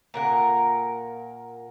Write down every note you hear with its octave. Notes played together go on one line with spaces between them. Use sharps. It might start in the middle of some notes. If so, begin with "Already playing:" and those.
A#2 A#4 F#5